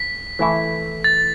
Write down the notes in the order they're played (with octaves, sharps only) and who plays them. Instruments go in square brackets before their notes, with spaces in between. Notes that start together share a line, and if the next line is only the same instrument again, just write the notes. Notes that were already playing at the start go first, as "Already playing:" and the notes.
Already playing: [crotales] B6
[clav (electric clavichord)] E3 A3 E4
[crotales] A6